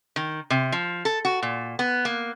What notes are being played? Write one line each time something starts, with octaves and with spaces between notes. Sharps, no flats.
D#3
C3
F3
A4
F#4
A#2
B3
A#3